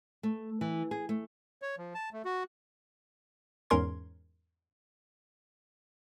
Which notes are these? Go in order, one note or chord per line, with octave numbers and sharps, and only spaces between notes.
A3
E3
G#4
A3
C#5
F3
A5
A3
F#4
E2 G#2 C#4 A#4 C6 G#6